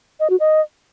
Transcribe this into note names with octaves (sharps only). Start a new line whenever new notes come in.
D#5
F#4
D#5